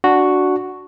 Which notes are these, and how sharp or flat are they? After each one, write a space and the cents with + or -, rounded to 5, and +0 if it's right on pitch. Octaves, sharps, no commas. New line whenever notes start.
D4 +0 F#4 +0